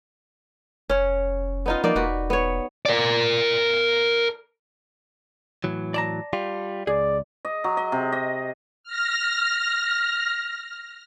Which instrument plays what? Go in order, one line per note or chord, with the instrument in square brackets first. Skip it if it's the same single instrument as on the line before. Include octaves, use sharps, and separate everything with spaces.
[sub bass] F1 [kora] C#4 C#5
[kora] B3 D#4 F4
[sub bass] F3 [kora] A#3 D#4 D5
[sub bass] E1 [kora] F#4 B4
[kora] B3 C#5
[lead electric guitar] A#4 D5
[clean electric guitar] A2 E3 F#3
[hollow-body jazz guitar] D5 A5 A#5
[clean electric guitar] G3 F4 G4
[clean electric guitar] C#2 [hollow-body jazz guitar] G#4 [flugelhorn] D5
[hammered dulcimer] D#5
F#3
D#5
C3
D#5
[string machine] F6 A#6